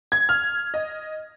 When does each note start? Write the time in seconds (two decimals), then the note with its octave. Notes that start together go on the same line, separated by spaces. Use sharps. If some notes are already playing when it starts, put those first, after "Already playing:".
0.12 G#6
0.29 F6
0.74 D#5